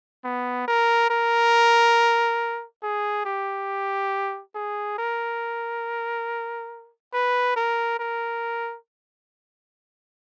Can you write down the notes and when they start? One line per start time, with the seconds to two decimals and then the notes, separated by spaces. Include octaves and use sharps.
0.24 B3
0.68 A#4
1.10 A#4
2.83 G#4
3.25 G4
4.55 G#4
4.98 A#4
7.13 B4
7.56 A#4
7.99 A#4